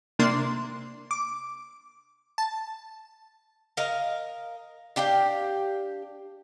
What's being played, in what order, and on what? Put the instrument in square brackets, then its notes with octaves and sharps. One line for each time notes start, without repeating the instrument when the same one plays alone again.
[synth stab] C3 A#3 D4 C6
D6
A5
[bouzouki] A#4 D#5 F5 A#5
D4 G4 F5 G5